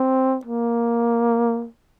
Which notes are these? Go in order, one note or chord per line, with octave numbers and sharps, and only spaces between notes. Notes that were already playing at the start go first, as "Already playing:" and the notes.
Already playing: C4
A#3